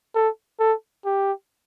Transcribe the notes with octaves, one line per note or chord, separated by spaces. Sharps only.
A4
A4
G4